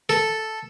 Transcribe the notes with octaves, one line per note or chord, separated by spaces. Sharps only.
A4